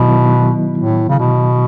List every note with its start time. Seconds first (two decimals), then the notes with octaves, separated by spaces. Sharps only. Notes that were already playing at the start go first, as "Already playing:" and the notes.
Already playing: B2 D#3 F#3 B3 E4
0.78 A2
1.09 C#3
1.19 B2